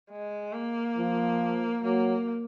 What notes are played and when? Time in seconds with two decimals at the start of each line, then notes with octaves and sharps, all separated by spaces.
0.11 G#3
0.54 A#3
0.98 F3
1.84 F#3 A#3